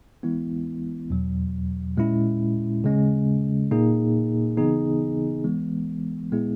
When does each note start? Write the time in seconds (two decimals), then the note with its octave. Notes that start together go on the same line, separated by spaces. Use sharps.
0.23 E3 G#3 B3 E4
1.10 E2 B2 F#3
1.97 A#2 G#3 C#4 E4
2.84 C#3 G#3 C#4
3.71 A#2 A#3 D#4 G#4
4.57 C#3 E3 B3 D#4 G#4
5.44 E3 G#3 B3
6.32 A#2 G#3 B3 E4 G#4